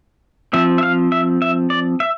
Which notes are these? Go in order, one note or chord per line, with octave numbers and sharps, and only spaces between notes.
F3 C4 E5
E5
F5
E5
E5
D5
E5